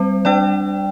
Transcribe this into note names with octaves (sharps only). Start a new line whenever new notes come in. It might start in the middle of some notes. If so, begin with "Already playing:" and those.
Already playing: G3 C4 C5
G3 D4 D5 G5